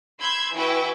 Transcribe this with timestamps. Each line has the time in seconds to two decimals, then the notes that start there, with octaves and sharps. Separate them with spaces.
0.19 B5 C6 E6 G6 G#6
0.54 E3 E4 F#4 B4 G5